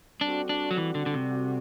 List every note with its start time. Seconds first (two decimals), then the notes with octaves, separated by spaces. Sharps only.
0.21 G3 C4 D4 F#4 A4 D5
0.49 D4
0.71 F#3
0.77 E3
0.95 D3
1.06 D3
1.14 C3